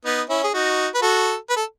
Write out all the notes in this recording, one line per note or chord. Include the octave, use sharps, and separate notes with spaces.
B3 D#4
C#4 E4
G#4
D#4 F#4
B4
F#4 A4
B4
A4